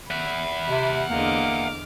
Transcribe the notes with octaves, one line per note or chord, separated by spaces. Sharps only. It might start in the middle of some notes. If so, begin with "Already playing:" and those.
E5 F#5 B5
C3
E2 D3 A#3 D#5 D6 F6